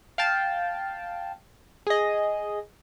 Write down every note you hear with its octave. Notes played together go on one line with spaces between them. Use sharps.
F5 G5 A5
G#4 D#5